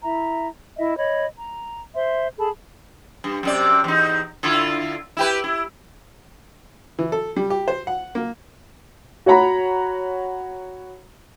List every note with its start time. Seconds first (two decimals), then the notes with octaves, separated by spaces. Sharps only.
0.03 E4 E5 A#5
0.78 E4 D#5 E5
0.97 C#5 D#5 B5
1.39 A#5
1.95 C5 E5 C6
2.38 G#4 A4 A5 B5
3.24 G2
3.43 F#2 C3 D5
3.84 E2 D#4
4.43 D3 E4 F4
5.17 E4 G4 B4
5.44 E4
6.99 E3
7.12 A4
7.36 G3
7.50 G4
7.68 C5
7.87 F#5
8.15 A#3
9.26 F#4 C#5 F#5 A#5 B5